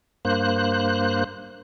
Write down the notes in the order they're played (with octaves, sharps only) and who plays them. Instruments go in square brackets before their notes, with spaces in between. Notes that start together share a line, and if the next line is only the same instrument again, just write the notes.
[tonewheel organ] G2 A#3 C5 F#6